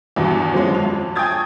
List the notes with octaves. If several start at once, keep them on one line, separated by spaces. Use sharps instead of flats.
E2 G2 B2
F3 F#3 G#3 C#4
F2 F7
G5 G#5 C#6 D#6 G#6 A6